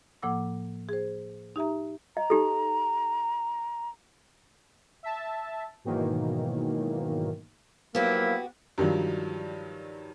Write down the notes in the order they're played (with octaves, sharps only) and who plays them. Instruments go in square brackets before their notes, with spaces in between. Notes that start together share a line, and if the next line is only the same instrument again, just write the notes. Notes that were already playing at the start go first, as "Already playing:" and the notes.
[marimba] A2 F3 A#3 F#5 D6 E6
G#4 C5
D#4 G4 E5 A#5
[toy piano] D#5 [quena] A#5
[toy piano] D#4 G4 A4
[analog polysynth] E5 A5
G#2 B2 D#3 E3 F#3 A#3
[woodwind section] F3 F#3 E4 [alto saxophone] A#3 [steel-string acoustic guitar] B3 F#4 G4
[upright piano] G2 D#3 F3 F#3 D4